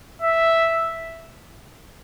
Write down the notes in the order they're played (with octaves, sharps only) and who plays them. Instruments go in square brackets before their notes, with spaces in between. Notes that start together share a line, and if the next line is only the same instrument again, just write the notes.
[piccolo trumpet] E5